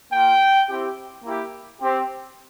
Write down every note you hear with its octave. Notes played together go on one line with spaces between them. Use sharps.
A#3 F4 G5
C4 E4 G4
A#3 E4 G4
C4 G4